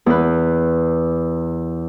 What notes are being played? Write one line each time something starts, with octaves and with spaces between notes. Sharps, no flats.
E2 B4